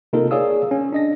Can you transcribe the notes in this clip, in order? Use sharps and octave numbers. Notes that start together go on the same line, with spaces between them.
C3 A#3 D#4 F4 A4 A#4
G#4 C#5 D5 F5 D#6 E6
C#4
D4 D#5 A#6